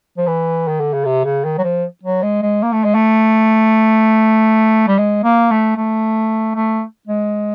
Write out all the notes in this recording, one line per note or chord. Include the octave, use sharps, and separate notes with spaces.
F3
E3
D#3
D3
C#3
C3
C#3
D#3
F#3
F3
F#3
G#3
G#3
A#3
A3
G#3
A3
G3
G#3
A#3
A3
A3
A3
G#3